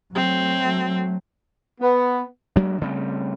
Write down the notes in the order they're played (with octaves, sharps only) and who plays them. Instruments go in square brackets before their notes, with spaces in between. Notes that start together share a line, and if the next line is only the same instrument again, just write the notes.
[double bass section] F#3 A3 [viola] C4
[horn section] B3
[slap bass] F#3 G#3 A#3 D4
C#3 G3 A3 C4